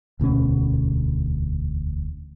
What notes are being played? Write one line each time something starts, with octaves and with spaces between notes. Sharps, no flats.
E1 D2 B2 C#4